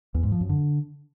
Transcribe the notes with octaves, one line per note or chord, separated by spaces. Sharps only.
E2
G#2
F3
F#2
D3